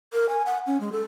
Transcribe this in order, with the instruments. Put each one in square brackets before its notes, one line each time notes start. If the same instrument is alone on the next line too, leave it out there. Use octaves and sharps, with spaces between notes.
[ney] A#4
G#5
F#5
C#4
G#3
A4